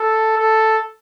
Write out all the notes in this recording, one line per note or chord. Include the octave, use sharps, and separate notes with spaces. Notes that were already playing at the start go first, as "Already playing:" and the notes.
Already playing: A4
A4